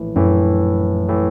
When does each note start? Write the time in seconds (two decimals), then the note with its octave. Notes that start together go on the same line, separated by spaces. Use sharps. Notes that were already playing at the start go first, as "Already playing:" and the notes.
Already playing: A#1 A2 E3
0.16 A#1 F#2 A2 E3
1.09 A2 E3